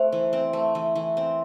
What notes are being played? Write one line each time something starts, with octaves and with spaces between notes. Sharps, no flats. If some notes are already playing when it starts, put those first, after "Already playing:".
Already playing: A3 C4 C5
E3
C4
A3
E3
E3
C4